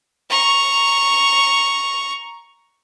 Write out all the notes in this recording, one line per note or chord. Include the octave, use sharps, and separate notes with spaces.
A#5 C#6